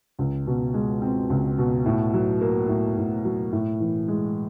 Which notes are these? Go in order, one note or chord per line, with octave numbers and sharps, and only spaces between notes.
C#2
B2
G#3
C4
C#2
B2
A2
F#3
A#3
A2
A2
F#3
A2
E3
G#3